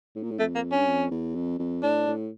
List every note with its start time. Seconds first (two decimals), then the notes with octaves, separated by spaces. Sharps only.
0.16 A2
0.23 A#2
0.31 A2
0.39 F2 A3
0.55 A#3
0.72 C#4
0.77 G2
0.87 F2
1.11 E2
1.35 F2
1.59 F2
1.83 A2 D4
2.08 A2